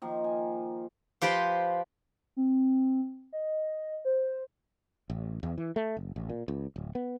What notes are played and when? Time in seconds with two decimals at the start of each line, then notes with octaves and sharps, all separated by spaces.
0.02 D#3 F3 A#3
0.24 G#5
1.22 F3 G4 B4 C5 G5
2.37 C4
3.33 D#5
4.05 C5
5.10 A1
5.43 E2
5.58 E3
5.76 A3
5.97 F#1
6.16 A1
6.29 A#2
6.48 C#2
6.76 D1
6.95 B3